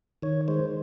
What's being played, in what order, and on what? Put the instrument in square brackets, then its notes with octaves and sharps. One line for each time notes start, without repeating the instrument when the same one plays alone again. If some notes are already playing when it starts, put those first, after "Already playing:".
[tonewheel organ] D#3 C#5
G#3 C5